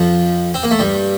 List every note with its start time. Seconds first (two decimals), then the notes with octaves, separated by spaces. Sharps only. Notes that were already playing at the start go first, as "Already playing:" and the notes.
Already playing: F2 F3
0.54 C4
0.63 A#3
0.71 A3
0.79 G2 G3